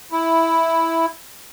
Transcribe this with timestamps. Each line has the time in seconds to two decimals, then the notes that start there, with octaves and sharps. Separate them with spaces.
0.12 E4